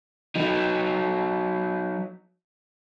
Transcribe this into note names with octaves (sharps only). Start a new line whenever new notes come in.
F#3 D#4